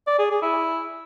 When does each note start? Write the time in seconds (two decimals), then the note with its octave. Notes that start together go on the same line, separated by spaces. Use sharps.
0.07 D5
0.19 G#4
0.30 G#4
0.42 E4